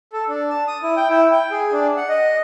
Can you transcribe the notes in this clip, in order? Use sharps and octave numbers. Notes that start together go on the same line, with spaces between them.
A4
D4
A5
D#6
E4
G5
E4
G5
G#4
D4
F#5
D#5